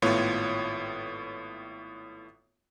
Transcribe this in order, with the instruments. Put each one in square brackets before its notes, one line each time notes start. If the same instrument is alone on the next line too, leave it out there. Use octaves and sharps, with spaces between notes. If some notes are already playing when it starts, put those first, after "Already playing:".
[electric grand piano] G#1 A2 B3 F4 C#5